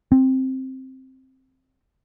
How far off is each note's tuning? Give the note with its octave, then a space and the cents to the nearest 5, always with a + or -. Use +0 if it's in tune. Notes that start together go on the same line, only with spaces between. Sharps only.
C4 +5